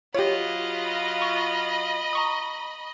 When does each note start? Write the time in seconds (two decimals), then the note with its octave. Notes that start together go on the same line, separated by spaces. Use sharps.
0.15 F#3 F4 G4 C#5 D#5 B5
1.22 C#6
2.13 A#5 C#6 D#6